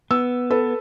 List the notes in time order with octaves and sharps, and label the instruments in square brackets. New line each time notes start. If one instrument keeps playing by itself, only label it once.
[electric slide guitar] B3 [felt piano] E6
[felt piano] A4 B4